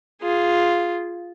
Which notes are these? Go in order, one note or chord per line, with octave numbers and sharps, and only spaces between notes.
F4 G#4